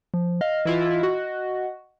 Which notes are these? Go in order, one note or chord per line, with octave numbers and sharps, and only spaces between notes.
F3
D#5 F5
E3 E4 F4
F#4